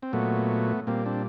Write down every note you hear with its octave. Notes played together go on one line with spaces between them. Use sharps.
C4
A#2 F#3 A3 B3
A#2 G3 A#3 C4
C4 D4